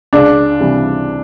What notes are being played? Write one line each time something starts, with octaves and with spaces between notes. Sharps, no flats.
C#2 D4
C3 E3 G3